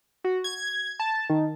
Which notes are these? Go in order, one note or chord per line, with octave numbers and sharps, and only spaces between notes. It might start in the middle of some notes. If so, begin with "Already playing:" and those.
F#4
G#6
A5
D#3